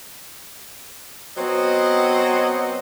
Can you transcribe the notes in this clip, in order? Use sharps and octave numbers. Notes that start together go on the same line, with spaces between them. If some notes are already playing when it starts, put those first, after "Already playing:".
F#3 B3 C4 C5 D#5 F#5